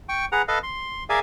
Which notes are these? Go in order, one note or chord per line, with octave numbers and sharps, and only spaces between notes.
G5 C#6
G#4 B4 F#5 A#5
A4 B4 D#5 F5
C6
G#4 A#4 D5 E5 F5 G#5